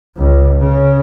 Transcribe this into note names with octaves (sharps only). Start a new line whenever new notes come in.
C#2
C#3